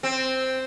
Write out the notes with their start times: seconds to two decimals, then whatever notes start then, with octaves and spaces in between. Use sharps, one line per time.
0.03 C4